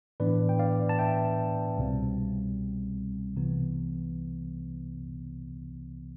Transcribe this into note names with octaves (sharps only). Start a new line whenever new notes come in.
A2 E3 B3 D4 B4 D5
G5
D5 F5
A5
E5 G5
C2 B2 G3 C4
C2 C3 E3 B3